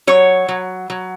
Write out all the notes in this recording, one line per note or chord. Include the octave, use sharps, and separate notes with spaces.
F#3 C#5
F#3
F#3